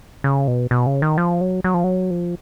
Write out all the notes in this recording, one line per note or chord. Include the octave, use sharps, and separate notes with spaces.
C#3
B2
B2
C#3
D#3
F3
F#3
F#3
F3
F#3
F3